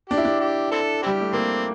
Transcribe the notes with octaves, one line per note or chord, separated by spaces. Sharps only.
D4 G4
E4
D4
G4
C4 E4 A4
G3 C4 E4 G4
A3
A#3 C4